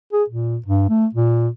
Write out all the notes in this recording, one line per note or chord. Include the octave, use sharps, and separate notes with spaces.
G#4
A#2
G2
A3
A#2